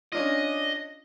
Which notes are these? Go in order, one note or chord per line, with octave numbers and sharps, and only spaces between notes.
C#4 D4 F4 D#5